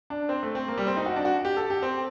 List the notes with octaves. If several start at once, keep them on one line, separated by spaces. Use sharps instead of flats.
D4
C4
A3
C4
A#3
G3
C4
D#4
F#4
D4
F#4
G4
A4
G4
C4